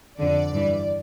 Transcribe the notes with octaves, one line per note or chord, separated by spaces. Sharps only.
F2 D3 D5
G2 E3